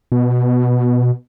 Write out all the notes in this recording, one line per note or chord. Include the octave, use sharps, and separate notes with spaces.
B2